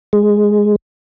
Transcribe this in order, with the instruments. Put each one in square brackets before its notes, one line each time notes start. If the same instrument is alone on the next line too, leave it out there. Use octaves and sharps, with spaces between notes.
[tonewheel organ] G#3